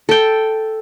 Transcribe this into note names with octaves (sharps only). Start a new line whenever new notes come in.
A4 G5